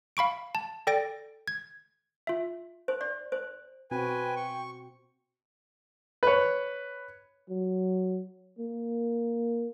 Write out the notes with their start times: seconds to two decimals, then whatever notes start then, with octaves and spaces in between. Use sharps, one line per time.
0.17 F5 B5 C#6 D7
0.55 A5
0.87 A4 D5 G5 A6 A#6 D7
1.48 G#6
2.27 F4 E5
2.88 C5
3.01 D5
3.32 C5
3.91 B2 C4 F#4 B4 G5 G#5
4.36 C#6
6.23 B4 C#5
7.50 F#3
8.59 A#3